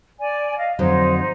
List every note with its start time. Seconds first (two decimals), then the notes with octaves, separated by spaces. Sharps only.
0.19 D5 G#5
0.57 D#5 F5
0.79 F2 D3 F#3 D#4 C5